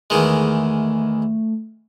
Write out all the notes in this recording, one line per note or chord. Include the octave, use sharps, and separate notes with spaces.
E2 D#3 G#3 A3